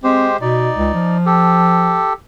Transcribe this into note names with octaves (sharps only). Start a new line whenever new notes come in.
G#3 C4 G4 C5
B2 D#4 D5
C#2
F3
G4 A4